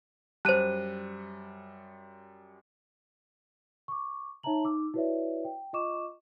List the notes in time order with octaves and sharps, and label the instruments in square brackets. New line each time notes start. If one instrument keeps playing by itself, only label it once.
[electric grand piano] F#2 G3 [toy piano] C5 A5 [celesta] F#6 D#7
[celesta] C#6 D6
D#4 C#5 E5 A5 A#5 F#7
D#4 D6 E6
E4 F#4 B4 C#5 D5 E5
G5
F4 D#5 C#6 D6 E7